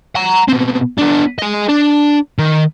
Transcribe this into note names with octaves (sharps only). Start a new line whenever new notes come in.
F#5 A#5
B2 C4
B3 D4
G#4 D#5
D4
D#3